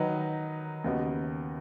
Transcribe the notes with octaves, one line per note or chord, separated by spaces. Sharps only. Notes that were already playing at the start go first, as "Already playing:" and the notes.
Already playing: D#3 F#3 D#4 B4
D#2 C#3 B3 F#4 D#5